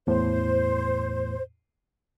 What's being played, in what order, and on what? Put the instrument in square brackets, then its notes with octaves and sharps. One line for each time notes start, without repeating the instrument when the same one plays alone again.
[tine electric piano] E2 A2 [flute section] C5